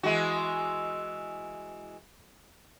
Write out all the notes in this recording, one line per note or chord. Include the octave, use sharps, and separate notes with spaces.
E3 G#3 F#4